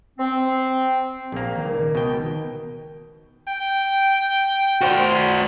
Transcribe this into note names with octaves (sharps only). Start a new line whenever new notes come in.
C4
A#1 A#3
C#2 D#3
B2 G5
G5
F#4 C5